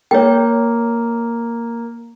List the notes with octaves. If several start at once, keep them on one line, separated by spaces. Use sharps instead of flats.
A#3 C#5 G5